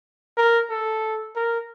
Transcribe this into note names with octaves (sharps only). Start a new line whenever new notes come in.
A#4
A4
A#4